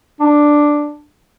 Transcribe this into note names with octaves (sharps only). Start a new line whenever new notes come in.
D4